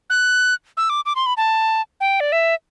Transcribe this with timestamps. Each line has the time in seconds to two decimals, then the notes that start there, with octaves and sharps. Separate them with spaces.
0.10 F#6
0.77 E6
0.90 D6
1.06 D6
1.16 C6
1.26 B5
1.37 A5
2.00 G5
2.20 D5
2.32 E5